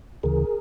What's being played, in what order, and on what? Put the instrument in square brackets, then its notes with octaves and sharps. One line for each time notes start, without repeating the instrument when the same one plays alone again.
[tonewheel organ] D2 C#3 E3 G#4 A#4